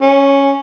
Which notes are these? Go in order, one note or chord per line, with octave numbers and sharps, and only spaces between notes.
C#4